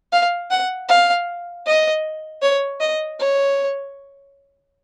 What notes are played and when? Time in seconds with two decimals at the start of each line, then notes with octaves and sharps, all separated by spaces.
0.12 F5
0.51 F#5
0.89 F5
1.66 D#5
2.42 C#5
2.80 D#5
3.20 C#5